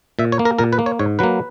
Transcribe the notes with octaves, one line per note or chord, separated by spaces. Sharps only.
A#2 E5
C#5
A#3
A#4
A#2 A#4
B4
A#3
C#5
G#2 C#5
F#3 A#3 B4